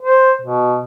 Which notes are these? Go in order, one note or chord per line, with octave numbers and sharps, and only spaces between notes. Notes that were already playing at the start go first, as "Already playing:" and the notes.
C5
B2